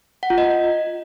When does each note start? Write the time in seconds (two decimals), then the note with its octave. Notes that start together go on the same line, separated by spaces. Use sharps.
0.23 F#5
0.30 F4
0.38 D#5